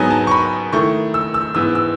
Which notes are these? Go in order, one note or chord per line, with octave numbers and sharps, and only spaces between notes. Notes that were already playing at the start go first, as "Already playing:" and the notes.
Already playing: G#2 F#3 B3 D#4 G#5
A5
C#6
B5
D#3 A3 E4 C#6
E6
E6
G#2 E3 B3 E6
E6